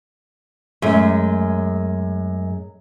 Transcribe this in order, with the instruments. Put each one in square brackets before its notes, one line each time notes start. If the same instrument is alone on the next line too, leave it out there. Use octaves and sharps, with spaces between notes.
[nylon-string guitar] F#2 G#3 A3